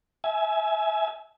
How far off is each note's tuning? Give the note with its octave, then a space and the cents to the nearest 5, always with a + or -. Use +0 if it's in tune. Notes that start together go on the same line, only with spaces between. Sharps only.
E5 -10 G#5 +25